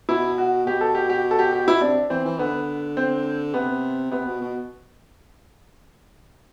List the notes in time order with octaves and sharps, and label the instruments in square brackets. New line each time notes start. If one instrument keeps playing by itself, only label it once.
[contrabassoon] B2 [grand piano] E4
[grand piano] F#4
[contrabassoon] B2 [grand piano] G4
[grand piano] A4
G4
G4
A4
G4
G4
E4
[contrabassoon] C3 [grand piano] D4
[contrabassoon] E3 [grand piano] C4
[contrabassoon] E3
[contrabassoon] D3 [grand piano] B3
[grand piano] C4
[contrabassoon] C3 [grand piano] B3
[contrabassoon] C3 [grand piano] B3
[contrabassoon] B2
B2